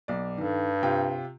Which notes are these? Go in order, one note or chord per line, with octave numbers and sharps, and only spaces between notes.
B1 D5
G2 D#3 A4
C3 F4 G5